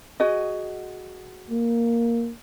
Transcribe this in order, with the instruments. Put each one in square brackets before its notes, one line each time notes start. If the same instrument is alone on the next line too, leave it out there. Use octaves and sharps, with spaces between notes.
[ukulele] F#4 G#4 D#5
[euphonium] A#3